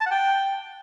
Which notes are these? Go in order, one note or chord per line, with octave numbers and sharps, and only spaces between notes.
A5
F#5
G5